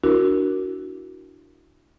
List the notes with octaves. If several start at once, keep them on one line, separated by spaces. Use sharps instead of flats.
D4 E4 F#4 A#4